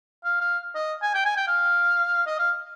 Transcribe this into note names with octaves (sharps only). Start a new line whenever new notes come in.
F5
F5
D#5
G#5
G5
G#5
G5
F5
D#5
F5